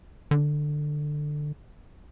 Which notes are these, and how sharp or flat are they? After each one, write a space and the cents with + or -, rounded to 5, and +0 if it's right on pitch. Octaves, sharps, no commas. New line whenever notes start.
D3 +15